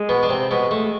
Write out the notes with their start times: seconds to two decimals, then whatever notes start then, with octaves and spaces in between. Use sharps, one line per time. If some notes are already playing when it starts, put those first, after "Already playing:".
Already playing: G#3
0.09 B2 B3
0.23 D4
0.29 C3 C4
0.51 B2 G#3 B3
0.71 A3